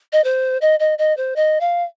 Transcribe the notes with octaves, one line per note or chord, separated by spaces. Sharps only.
D#5
C5
D#5
D#5
D#5
C5
D#5
F5